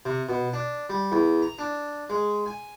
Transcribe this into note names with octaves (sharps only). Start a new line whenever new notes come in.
C3
B2
D4
G3
E2
A#5
D4
G#3
G#5